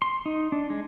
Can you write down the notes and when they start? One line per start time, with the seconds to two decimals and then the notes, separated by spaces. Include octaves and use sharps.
0.02 C6
0.26 D#4
0.52 D4
0.70 G#3